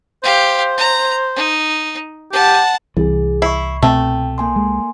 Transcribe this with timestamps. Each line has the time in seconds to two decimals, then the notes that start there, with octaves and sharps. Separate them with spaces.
0.23 G4 C5 F5
0.78 A#5
1.36 D#4
2.33 G4 F#5 A5
2.97 C2 E3 G#4
3.42 E4 C#6 C7
3.83 B2 A3 C4 G5
4.38 A#3 G#5 C6
4.56 G#3